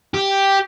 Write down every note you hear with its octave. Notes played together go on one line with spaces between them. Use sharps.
G4